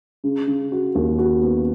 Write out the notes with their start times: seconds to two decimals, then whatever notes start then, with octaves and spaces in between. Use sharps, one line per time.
0.24 C#3
0.47 C#3
0.72 F#4
0.95 D#2
1.19 F#4
1.43 B3